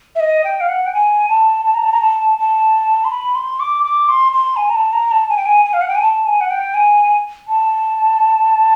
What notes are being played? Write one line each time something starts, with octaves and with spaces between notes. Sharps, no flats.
E5
D#5
G5
F5
F#5
G5
G#5
A5
A5
A#5
A5
A#5
A5
A5
C6
B5
C6
D6
D6
C6
C6
G#5
A#5
A5
A#5
A5
G#5
G5
G#5
G#5
F5
F#5
G5
G#5
A5
G#5
F#5
G5
G#5
A5